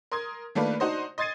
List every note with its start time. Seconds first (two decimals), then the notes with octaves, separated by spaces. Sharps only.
0.12 A#4 C6 D#6 G#6
0.55 D#3 A3 A#3 D4 F4 B4
0.80 D4 D#4 F#4 C5 D#5
1.18 D#5 C6 G#6 A6 C7 D#7